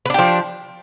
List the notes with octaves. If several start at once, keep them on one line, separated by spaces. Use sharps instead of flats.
F3 D4 G4 B4